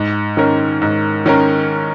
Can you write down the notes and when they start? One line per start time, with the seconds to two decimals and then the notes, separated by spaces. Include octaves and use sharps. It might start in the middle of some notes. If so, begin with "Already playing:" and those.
Already playing: G#2
0.37 D#3 C#4 A#4
0.82 G#2
1.26 D#3 C#4 A#4